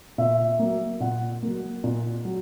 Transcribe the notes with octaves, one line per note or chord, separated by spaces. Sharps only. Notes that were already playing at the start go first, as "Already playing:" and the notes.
A#2 E5
F#3 A#3
A#2 F#5
F#3 A#3
A#2
F#3